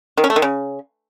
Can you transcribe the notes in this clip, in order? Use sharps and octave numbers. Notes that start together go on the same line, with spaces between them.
D#3
C#4
A3
D#3
C#3